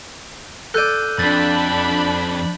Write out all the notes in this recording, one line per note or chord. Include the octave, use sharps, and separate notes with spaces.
A4 D5 F#6 G6 D#7
F2 D4 B5 A6